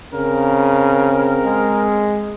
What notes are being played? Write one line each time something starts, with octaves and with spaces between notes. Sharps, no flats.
C#3 C4 A#4
G#3